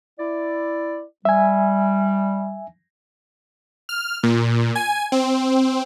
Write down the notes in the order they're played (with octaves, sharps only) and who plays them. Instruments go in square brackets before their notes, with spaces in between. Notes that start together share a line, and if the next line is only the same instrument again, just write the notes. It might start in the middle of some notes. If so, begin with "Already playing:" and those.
[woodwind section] E4 D5
[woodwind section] G3 [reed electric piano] E5 G#5
[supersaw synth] F6
A#2
G#5
C4